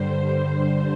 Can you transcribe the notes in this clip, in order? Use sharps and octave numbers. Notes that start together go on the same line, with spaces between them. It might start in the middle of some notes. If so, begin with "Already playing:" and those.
Already playing: G2 D3 G3 C5
C5